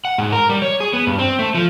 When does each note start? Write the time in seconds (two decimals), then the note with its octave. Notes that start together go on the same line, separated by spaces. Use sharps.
0.05 F#5
0.18 G#2
0.33 A#4
0.49 G3
0.62 C#5
0.80 G#4
0.93 B3
1.07 G2
1.19 C4
1.39 A3
1.54 F3